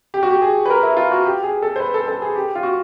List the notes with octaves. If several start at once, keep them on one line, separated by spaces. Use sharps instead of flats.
G4
F#4
G4
G#4
B4
A#4
E4
F4
F#4
G4
G#4
A4
C5
B4
A4
A4
G#4
G4
F4
F#4